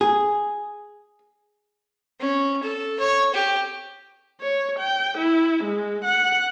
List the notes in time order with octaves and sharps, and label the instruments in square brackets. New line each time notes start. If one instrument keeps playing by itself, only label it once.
[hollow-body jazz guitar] G#4
[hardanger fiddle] C#4
A4
C#5
G4
[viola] C#5
G5
E4
G#3
F#5